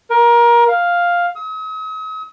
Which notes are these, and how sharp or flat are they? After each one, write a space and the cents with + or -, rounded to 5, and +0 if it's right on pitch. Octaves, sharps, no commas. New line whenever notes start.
A#4 +25
F5 +5
D#6 +45